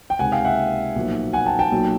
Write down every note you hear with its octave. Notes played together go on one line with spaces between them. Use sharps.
G5
C#2 C3 D#3 F#5 G#5
F5 G5
E5 F#5
B1 A#2 F3
F#5 G#5
G5 A5
G5 A5
B1 A#2 F#3